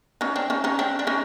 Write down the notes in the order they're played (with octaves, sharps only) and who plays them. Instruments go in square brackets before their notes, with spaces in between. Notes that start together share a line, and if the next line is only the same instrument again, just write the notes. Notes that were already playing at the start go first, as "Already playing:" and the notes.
[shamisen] C#4 D#4
C4 D4
C#4 D#4
C#4 D#4
C4 D4
D4
C#4 D#4